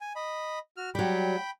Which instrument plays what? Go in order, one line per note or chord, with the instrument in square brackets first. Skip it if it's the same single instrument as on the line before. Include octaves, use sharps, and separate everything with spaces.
[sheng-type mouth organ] G#5
D#5 B5
F#4 F6
[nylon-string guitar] F#3 G3 [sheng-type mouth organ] G5 B5